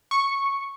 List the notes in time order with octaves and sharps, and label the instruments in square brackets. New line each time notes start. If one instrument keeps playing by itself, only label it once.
[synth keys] C#6